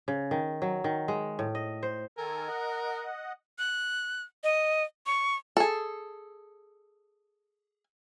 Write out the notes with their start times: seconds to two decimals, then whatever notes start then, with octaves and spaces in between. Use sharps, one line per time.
0.08 C#3
0.31 D#3
0.62 F#3
0.84 D#3
1.08 G#3
1.39 A2
1.55 D#5
1.83 C5
2.18 D#3 A4 A#4 G#5
2.48 D#5 F#5
3.58 F#6
4.44 D#5
5.06 C#6
5.57 G#4 A4